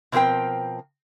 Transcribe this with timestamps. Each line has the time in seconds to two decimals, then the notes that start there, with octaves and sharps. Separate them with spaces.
0.12 B2 F3 C4 A#4 G5